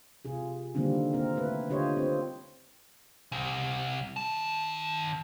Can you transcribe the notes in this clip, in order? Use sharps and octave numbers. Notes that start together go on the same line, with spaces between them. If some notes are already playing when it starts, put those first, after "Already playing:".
C3 F4 G#4
D3 D#3 G3 A#3 C4 D4
A#3 C4 A#4
A3 E4 B4
D3 F4 G4 C5 C#5 D#5
C4
C2
D#3 A5